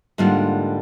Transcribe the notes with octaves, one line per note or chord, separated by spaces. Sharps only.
G#2 D3 G3 A#3 F4